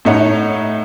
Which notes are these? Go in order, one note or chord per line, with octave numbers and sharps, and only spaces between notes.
A2 A3 D#4 C#5 F#5